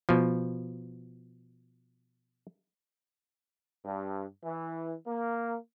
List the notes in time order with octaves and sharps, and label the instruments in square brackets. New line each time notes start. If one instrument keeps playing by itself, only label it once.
[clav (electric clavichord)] B2 F3
[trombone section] G2
E3
A#3